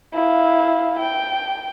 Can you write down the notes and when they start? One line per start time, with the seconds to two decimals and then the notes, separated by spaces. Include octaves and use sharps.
0.14 E4 F5
0.99 G5